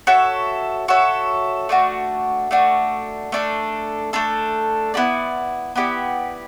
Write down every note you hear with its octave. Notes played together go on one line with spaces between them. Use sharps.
F#4 A4 C#5 E5
F#4 A4 C#5 E5
A3 D4 F#4
A3 D4 F#4
A3 D4 A4
A3 D4 A4
B3 E4 G4 D5
B3 E4 G4 D5